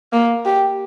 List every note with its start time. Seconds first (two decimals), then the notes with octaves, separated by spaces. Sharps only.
0.13 A#3
0.45 G4